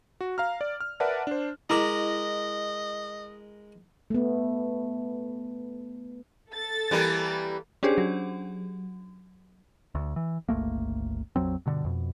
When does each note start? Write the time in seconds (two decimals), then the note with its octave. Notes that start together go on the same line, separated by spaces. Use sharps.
0.21 F#4
0.38 F5 A#5 F6
0.61 D5
0.80 F6
1.00 A#4 B4 D5 E5 F#5 A5
1.27 D4 C5
1.70 G#3 E4 A#4 D#5 A#5 B5 D6
4.10 A3 B3
6.52 A4 A6
6.91 E3 G3 A#3
7.83 C#4 D4 G4 G#4 C5
7.98 F#3
9.95 D2
10.16 E3
10.49 G1 C#2 A3 A#3
11.36 A#1 F2 F#3 C4
11.66 G2 B2 D3
11.84 F2 B2